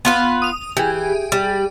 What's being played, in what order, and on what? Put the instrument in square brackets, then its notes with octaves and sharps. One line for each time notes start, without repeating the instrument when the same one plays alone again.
[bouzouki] B3 F4 B4
[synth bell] D#6 F7
[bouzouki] E3 [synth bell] G4 G#4
[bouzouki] G3